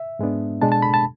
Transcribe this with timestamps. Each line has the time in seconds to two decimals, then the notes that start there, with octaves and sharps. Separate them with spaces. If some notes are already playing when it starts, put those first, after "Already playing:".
Already playing: E5
0.19 G#2 G#3 B3 D4
0.62 B2 G#3 D4 A5
0.72 A5
0.82 B5
0.94 A5